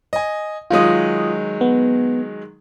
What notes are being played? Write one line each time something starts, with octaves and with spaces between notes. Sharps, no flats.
D#5 G#5
D#3 F#3 G#3 F4 D#6
B3